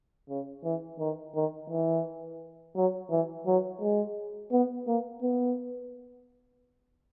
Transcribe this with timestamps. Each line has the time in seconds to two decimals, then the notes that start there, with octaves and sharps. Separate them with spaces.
0.29 C#3
0.64 E3
1.00 D#3
1.35 D#3
1.70 E3
2.76 F#3
3.11 E3
3.46 F#3
3.81 G#3
4.52 B3
4.87 A#3
5.22 B3